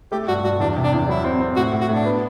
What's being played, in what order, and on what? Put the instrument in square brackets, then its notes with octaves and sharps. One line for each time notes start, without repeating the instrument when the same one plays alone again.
[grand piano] A3 [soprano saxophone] G4
[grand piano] G2 [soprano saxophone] F#4
[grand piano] G2 [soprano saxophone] F#4
[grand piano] E2 [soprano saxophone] D4
[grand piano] C3
[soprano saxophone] D4
[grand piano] E2
[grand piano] F#3 [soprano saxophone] E4
[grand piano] C4
C4
[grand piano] A2 [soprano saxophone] F#4
[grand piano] A2
[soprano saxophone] F#4
[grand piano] A2 [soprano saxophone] D4
[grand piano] B3